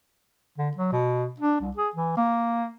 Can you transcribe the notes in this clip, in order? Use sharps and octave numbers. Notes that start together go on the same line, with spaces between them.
D3
F#3
B2
D4
C2
G#4
E3
A#3